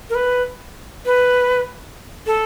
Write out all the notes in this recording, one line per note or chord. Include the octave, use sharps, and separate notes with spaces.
A#4
B4
B4
A4